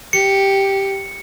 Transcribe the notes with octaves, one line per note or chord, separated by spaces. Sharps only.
G4 C#7